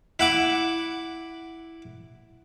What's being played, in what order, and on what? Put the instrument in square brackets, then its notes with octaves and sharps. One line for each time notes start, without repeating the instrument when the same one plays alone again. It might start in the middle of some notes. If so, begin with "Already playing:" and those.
[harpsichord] E4 F#5 D6